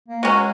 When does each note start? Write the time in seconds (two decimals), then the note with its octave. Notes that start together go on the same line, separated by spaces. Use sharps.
0.08 A#3
0.23 F#3 G#3 C#4 F#4